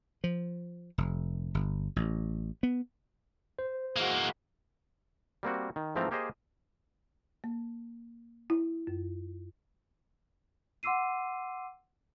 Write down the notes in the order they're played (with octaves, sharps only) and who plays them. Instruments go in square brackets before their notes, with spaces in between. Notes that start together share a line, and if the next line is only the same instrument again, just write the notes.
[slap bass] F3
F1
G1
A1
B3
[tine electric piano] C5
[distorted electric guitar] E3 A#3 [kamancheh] G#3 F#4
[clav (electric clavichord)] G3 A#3 C4 F#4
D#3
G#2 E3 F3 A3 C4 A#5
A#3 G4 G#4 C5 D#5
[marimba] A#3
E4
F#2
[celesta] F#5 C6 D6 E6 C7 D#7